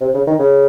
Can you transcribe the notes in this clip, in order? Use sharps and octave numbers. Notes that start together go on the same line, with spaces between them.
C3
C#3
D#3
C#3